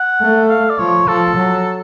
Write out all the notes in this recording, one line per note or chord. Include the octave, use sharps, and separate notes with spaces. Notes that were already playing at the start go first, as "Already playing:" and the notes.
Already playing: F#5
A3
F5
D5
F3 C#5
F3 A4
F#3